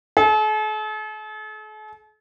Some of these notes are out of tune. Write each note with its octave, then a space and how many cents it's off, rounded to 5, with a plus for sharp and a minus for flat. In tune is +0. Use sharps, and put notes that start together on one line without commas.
A4 -45